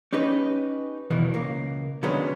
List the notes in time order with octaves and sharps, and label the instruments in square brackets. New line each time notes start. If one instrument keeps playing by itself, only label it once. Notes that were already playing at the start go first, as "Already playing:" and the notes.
[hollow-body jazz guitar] C#4 D#4 G4 B4 D#5
B1 E2 B2 D#3 E3
C#2 A#3
D3 D#3 F#3 G#3 B3 C#4